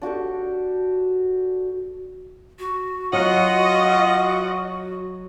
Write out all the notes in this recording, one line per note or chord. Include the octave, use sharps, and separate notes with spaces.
D4 F#4 G4 A4
F#4
F#3 F4 D#5 F#5